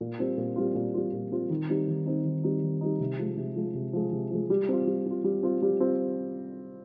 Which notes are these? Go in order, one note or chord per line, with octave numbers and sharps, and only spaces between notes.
A#2
G3 C4 F4
A#2
G3 C4 F4
A#2
G3 C4 F4
A#2
G3 C4 F4
D#3
G3 C4 D#4
D#3
G3 C4 D#4
D#3
G3 C4 D#4
D#3
G3 C4 D#4
C3
F3 G#3
C3
F3 G#3
C3
F3 G#3
C3
F3 G#3
G3
C4 F4
G3
C4 F4
G3
C4 F4
G3
C4 F4